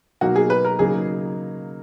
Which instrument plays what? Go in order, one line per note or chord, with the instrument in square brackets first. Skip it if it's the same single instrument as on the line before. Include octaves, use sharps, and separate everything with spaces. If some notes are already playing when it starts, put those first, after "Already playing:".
[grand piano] B2 F#3 A#3 D#4 [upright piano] F#4
[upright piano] G#4
B4
A#4
[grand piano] C#3 F#3 A#3 D#4 [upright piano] G#4